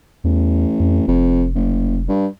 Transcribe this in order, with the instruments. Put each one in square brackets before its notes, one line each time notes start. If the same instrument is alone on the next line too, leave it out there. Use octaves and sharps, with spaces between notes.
[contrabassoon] A1 [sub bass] E2
[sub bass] F2
[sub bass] F1 [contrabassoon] F2
[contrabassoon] F#1
G2